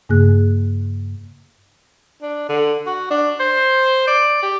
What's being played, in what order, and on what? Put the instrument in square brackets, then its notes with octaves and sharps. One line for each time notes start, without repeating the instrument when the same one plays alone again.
[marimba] G2 C#3 A#3 G#4 F#6
[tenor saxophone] D4
D3
F#4
D4
C5
D5
G4